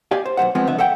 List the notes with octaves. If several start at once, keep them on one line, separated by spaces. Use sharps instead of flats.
G4 D5 D#5 F5 G#5
C5
B1 F3 C5 F#5
B2 F3 G#3 B3 C4
C#2 D3 F3 B3 E5
A4 E5 F#5 G5